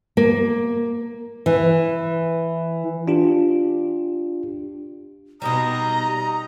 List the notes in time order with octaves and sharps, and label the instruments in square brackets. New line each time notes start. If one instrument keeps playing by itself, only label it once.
[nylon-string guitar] A#3
E3
[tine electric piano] D4 F4 G4
[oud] B2 G3 [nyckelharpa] D#4 D#5 [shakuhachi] A#5